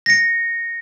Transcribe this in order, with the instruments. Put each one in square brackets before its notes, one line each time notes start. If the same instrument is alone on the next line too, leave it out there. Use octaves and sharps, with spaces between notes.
[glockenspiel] A#6 C#7